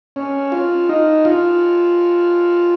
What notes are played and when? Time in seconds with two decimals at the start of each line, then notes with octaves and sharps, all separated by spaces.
0.16 C#4
0.52 F4
0.89 D#4
1.25 F4